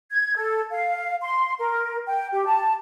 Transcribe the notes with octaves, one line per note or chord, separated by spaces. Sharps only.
G#6
A4
F5
C6
A#4
G5
G4
A5